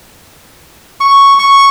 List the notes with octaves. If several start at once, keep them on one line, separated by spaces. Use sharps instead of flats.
C#6
C#6